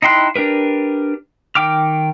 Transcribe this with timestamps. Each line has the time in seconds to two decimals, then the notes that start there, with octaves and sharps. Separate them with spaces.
0.02 D#4 E4 G5 C6 F#6
0.36 D4 G4 A#4 B4
1.55 D#3 G5 D6 F6